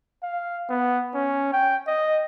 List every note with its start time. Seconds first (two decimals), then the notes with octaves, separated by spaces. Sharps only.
0.23 F5
0.69 B3
1.14 C#4
1.53 G5
1.87 D#5